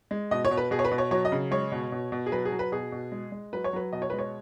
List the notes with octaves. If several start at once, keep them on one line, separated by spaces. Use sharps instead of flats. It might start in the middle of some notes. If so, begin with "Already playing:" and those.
G#3
B2 D#5
C#5
B2
B4
B2 G#4
C#5
B4
B2
C#5
F#3 C#5
D#5
C#3
G#3 C#5
B2
B2
B2
G#4
F#3 B4
G#4
F#3
B4
B2 G#4
B2
G#3
G#3
F#3 B4
C#5
F#3 B4
B2 D#5
C#5
G#3 B4
C#5